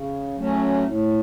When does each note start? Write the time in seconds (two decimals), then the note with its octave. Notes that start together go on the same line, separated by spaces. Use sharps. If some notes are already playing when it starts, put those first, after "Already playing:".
Already playing: C#3
0.37 F#3 A3 C#4
0.83 A2